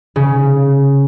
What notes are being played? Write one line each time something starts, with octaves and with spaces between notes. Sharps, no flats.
C#3